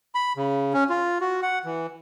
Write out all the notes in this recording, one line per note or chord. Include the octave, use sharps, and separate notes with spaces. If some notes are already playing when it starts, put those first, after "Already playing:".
B5
C#3
C#4
F4
F#4
F#5
E3